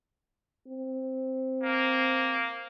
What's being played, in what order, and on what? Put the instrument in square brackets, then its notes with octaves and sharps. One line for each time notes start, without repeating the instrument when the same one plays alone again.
[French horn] C4
[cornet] A#3